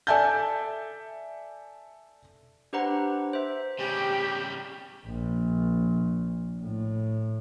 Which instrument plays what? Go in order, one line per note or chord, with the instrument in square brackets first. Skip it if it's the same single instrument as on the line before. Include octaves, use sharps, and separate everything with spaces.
[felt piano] A4 D5 E5 G#5 A5 G6
[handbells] D4 G4 B4 C5 F#5 A#5
C5 E5
[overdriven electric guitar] C#3 G3 [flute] G4
[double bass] A#1
A2